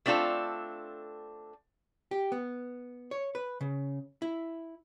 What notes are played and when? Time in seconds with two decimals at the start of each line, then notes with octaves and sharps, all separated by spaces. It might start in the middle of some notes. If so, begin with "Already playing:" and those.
0.06 A3 C4 D4 F4 A4
2.11 G4
2.32 B3
3.11 C#5
3.35 B4
3.61 C#3
4.22 E4